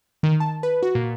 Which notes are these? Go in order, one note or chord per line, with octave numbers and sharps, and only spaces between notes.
D#3
A5
B4
F#4
A#2